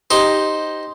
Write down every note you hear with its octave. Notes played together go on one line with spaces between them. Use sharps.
D#4 G4 C5